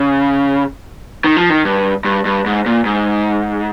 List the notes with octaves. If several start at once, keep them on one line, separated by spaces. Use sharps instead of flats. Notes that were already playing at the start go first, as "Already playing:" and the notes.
Already playing: C#3
D#3
F3
D#3
G2
G2
G2
G#2
A#2
G#2